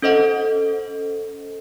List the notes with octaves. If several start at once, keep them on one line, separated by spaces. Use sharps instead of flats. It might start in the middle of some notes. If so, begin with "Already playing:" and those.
C#4 A4 C5 D#5 F#5